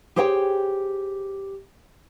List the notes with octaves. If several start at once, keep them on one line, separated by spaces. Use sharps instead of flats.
G4 G#4 C5 C#5 F#5 G5